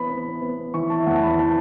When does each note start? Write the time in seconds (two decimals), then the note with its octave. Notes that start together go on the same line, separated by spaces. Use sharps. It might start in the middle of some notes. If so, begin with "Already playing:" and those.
Already playing: E3 B3 B5
0.10 B3
0.42 B3
0.74 E3 C#6
0.90 A5
0.99 E5
1.06 E2 F#5
1.15 A5
1.23 B5
1.39 E3 A5